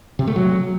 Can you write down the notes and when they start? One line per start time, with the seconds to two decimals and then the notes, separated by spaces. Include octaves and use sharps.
0.19 C3
0.27 A3
0.36 F#3